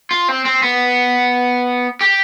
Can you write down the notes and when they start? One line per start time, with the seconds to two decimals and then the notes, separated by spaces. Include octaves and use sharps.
0.11 F4
0.29 C4
0.45 C4
0.62 B3
2.01 G4